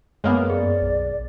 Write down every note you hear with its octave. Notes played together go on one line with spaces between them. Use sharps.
F#2 G#3 A#3 B3 C#5
G#4 D5
B1